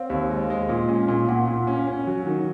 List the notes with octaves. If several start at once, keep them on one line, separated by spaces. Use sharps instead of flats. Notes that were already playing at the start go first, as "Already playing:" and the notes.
Already playing: C4 C5 C#5 F5
D#2
G#3
G#3
A#2
C#4
A#2
F5
A#2 F#5
A#2
C#4
C#4
F#3
D#3